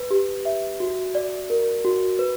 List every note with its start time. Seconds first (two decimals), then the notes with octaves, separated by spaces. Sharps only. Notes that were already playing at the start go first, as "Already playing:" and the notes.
Already playing: B4
0.11 G4
0.45 E5
0.80 F#4
1.15 D5
1.50 A#4
1.85 F#4
2.19 B4